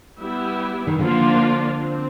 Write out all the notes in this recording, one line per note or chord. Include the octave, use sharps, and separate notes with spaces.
G3 B3 E4 G4
D#3
D3 F3 A#3 D4 F4
C4